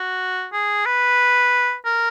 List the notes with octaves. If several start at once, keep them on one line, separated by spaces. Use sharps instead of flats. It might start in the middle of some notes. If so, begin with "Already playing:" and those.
Already playing: F#4
G#4
B4
A#4